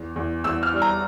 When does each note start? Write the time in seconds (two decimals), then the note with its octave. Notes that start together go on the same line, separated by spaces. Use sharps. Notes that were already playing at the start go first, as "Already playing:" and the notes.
Already playing: E2
0.16 E2
0.44 E2 E6
0.63 F6
0.73 G3
0.82 A#5